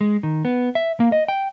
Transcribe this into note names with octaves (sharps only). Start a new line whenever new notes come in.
G#3
D#3
B3
E5
A#3
D#5
G5